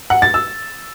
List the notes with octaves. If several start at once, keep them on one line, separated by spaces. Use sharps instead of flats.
F#5
A6
E6